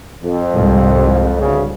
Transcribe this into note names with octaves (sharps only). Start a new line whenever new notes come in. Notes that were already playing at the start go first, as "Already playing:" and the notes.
F2
C2 G#2
D2 G2 C#3